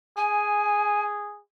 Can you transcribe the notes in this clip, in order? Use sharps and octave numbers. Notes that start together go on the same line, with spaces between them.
G#4 G#5